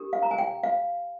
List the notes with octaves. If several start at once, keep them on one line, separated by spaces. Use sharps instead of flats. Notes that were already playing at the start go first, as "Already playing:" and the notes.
Already playing: D4 G4 A#4
F5
A#5
G#5
G5
F5